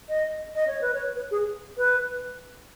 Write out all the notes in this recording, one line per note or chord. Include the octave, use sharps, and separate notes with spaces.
D#5
D#5
C#5
B4
C#5
B4
G#4
B4